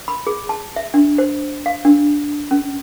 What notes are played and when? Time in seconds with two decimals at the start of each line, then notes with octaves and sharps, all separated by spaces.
0.08 B5
0.27 G#4
0.49 A5
0.76 E5
0.94 D4
1.18 C5
1.66 F5
1.85 D4
2.51 C#4